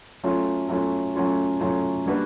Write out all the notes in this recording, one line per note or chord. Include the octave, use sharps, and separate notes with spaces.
F#3 A3 C#4 F4
F#3 A3 C#4 F4
F#3 A3 C#4 F4
F#3 A3 C#4 F4
G3 A#3 D4 F#4 B4